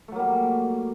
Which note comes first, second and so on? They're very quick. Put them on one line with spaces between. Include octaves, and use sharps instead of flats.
A3 F#3 A#3 G3